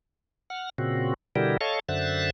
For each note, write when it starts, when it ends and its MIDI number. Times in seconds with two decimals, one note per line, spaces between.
0.50 0.69 78
0.50 0.69 89
0.78 1.14 46
0.78 1.14 49
0.78 1.14 60
0.78 1.14 66
1.36 1.57 47
1.36 1.57 50
1.36 1.57 55
1.36 1.57 64
1.36 1.57 67
1.36 1.57 70
1.61 1.80 69
1.61 1.80 73
1.61 1.80 75
1.61 1.80 77
1.61 1.80 81
1.61 1.80 85
1.89 2.30 42
1.89 2.30 50
1.89 2.30 72
1.89 2.30 76
1.89 2.30 90
1.89 2.30 93